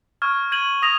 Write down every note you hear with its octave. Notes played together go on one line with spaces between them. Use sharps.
C#6 F6 G#6
G#6 D#7 F#7
D#6 A#6 F7